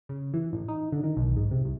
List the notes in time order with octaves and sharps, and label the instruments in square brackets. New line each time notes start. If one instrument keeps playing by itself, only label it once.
[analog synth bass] C#3
E3
A1
D#4
D3
D#3
B1
G#2
C3
C2